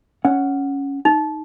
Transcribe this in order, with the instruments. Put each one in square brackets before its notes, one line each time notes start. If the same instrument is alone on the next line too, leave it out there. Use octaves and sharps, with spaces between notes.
[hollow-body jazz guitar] C#4 F#5
[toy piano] D#4